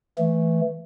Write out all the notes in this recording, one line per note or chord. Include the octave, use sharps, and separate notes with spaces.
E3 A3